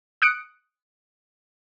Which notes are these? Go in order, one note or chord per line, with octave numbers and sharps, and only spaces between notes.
D#6 F#6 C#7 D7